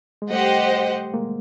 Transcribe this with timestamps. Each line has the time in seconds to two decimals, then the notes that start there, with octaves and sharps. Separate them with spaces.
0.22 G#3
0.30 G3 A3 G4 C5 D#5 F#5
1.14 G#3 A#3